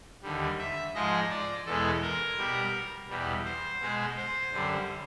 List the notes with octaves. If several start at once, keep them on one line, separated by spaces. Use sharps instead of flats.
D#2 D3 G3
E5
G#2 F3 G#3 D#5
D5
E2 B2 G#3 A4
A#4
B2 G3
E2 B2 G3
C5
B2 G#3
C5
F#2 D3 G3